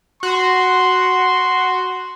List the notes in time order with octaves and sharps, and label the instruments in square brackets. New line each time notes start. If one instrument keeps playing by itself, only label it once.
[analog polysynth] F#4 [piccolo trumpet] C6